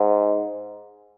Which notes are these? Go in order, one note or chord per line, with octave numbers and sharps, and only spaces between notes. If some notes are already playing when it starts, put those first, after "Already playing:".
Already playing: G#2